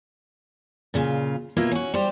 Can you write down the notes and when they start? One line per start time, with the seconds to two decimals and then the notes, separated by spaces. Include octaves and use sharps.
0.94 A#2 C#3 F4
1.57 B2 A#3 E4 F4 F5
1.71 C#4 F#4
1.94 G3 G4 C5